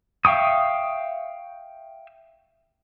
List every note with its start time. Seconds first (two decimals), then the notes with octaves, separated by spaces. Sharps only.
0.25 E5 F5 G5 C#6 D#6